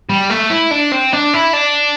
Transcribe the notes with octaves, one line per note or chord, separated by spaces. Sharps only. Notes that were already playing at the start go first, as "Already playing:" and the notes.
G3
A3
E4
D4
C4
D4
E4
D4